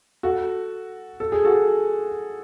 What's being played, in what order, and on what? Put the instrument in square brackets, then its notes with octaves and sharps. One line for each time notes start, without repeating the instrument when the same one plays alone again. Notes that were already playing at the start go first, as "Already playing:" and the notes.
[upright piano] F#4 A4
A4
G#4
F#4 A4